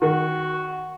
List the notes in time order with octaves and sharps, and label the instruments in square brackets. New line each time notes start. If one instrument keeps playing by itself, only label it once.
[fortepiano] D#3 [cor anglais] F#4